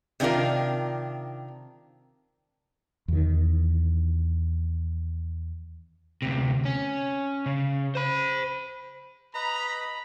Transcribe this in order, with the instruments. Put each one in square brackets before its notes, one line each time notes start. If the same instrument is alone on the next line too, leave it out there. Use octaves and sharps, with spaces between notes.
[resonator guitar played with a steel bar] C3 D#3 D4 F4 A#4
[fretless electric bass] E2 D#3
[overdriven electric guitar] D2 C3
C#4
C#3
C5 B5
[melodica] B4 D#5 [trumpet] A#5 [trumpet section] B5